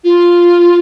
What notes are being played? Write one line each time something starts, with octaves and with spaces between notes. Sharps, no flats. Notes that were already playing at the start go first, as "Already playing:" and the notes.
F4